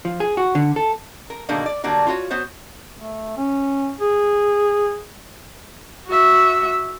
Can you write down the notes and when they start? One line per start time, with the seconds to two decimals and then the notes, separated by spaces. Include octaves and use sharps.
0.05 F3
0.20 G#4
0.37 F#4
0.55 D3
0.76 A4
1.30 A#4
1.49 B2 D3 D#3 G#3 A#3 D4
1.66 D5
1.84 D3 F#3 G3 A#3 D4 F#4
2.07 F4 F#4 C#5
2.30 B3 F#4 C5 C#5
2.94 A3
3.37 C#4
4.00 G#4
6.07 F#4 E5